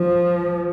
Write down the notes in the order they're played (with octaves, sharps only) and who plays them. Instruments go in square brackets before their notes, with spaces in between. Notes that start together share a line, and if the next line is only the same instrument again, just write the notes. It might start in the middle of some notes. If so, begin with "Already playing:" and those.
Already playing: [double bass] F3